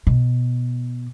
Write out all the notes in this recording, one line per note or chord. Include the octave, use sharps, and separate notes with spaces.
B2